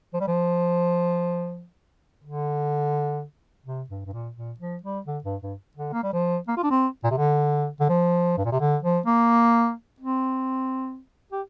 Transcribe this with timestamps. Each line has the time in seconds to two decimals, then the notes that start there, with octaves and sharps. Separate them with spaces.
0.13 F3
0.21 G3
0.28 F3
2.24 D3
3.66 C3
3.90 G2
4.06 G2
4.13 A#2
4.36 A#2
4.60 F3
4.83 G3
5.07 D3
5.24 G2
5.42 G2
5.77 D3
5.93 A#3
6.03 G3
6.13 F3
6.48 A#3
6.57 F4
6.63 D4
6.71 C4
7.04 A#2
7.11 C3
7.18 D3
7.80 D3
7.89 F3
8.37 G2
8.45 A#2
8.52 C3
8.60 D3
8.83 F3
9.06 A#3
10.00 C4
11.32 G4